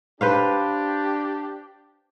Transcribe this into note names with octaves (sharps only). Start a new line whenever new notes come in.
D4 G4 B4 C5 F5